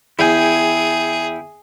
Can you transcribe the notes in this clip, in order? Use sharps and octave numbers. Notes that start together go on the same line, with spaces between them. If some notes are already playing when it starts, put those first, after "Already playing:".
E2 E4 G#4 E5 G5 G#5